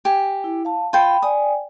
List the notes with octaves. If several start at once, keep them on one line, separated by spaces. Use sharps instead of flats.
G4 G#5
E4
F5 A5
F4 G5 B5
D5 G5 G#5 D#6